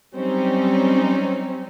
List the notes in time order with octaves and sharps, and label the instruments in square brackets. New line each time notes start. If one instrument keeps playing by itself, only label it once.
[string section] F#3 G3 C4 C#4 D#4